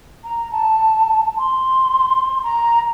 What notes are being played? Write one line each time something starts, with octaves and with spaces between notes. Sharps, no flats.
A#5
A5
C6
A#5